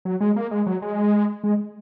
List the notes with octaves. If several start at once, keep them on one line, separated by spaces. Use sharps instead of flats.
F#3
G#3
A#3
G#3
F#3
G#3
G#3